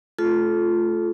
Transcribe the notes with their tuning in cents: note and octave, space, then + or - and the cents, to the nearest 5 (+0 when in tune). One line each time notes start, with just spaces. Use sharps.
A3 -10 F4 +0 A4 -25